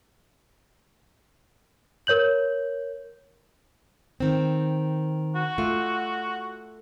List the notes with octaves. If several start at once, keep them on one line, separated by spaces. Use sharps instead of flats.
A#4 C#5 G6 F#7
D#3 C4
F#4
A3 F4